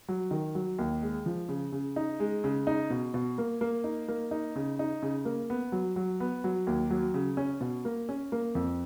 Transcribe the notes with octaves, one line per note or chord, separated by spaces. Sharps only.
F#3
D#3
F#3
D#2
G#3
F3
C#3
C#3
D#4
G#3
C#3
D#4
B2
B2
A#3
A#3
D#4
A#3
D#4
C#3
D#4
C#3
A#3
B3
F#3
F#3
B3
F#3
D#2
F#3
C#3
C#4
B2
A#3
C#4
A#3
F2